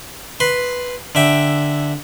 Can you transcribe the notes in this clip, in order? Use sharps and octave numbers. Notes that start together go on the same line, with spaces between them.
B4 C6
D3 E5 G5